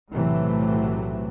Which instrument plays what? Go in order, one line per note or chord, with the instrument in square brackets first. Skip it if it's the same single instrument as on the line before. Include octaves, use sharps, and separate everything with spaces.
[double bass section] B1 A2 C3 E3 F#3 A3